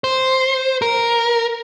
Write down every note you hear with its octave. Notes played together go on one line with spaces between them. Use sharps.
C5
A#4